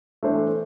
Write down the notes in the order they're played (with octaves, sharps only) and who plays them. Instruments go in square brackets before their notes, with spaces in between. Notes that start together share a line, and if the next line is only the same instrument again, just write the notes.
[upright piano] E3 A3 D4 A4 C5